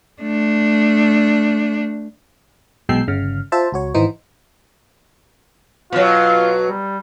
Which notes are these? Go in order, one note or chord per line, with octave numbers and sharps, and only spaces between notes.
A3 D4
B1 B2 G#3 G5 E6 C7
G1 C#3 F6
F4 C5 E5 A5
C#2 F#4 C#5
G#1 E3 D#4 C5
B2 F#3 F4
G3